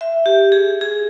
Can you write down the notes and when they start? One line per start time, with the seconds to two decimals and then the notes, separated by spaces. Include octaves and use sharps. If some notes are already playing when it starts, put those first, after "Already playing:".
0.01 E5
0.26 G4
0.52 G#4
0.81 G#4